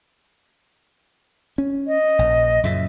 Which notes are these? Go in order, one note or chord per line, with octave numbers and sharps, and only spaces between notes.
C#4
D#5
A#1
F#2 A#2 C#3 E5